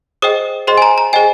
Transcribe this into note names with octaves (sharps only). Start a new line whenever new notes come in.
G#4 C5 D#5 G5 D#6
G#4 C5 D#5 G5 C6
G#5
A#5
A#5
G#4 C5 D#5 G5 G#5